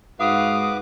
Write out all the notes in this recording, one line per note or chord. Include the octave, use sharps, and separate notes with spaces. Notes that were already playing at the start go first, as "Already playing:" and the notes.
G#2 F#4 B4 F5 D6 D#6